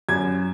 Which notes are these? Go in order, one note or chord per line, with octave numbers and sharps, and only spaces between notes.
F#2 G#6